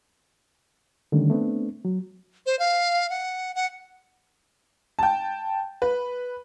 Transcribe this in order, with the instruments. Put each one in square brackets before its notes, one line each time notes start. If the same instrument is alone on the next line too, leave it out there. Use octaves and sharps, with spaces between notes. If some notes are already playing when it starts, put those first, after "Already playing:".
[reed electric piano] D3 D#3 G3 A3 C#4
A3 B3 C4 D4
F#3
[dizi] C5
F5
F#5
F#5
[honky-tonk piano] G5 A5
B4